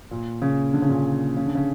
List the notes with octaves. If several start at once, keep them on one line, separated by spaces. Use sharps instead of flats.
A#2
C#3
D3
C#3
A#2 D3
C#3
D3
C#3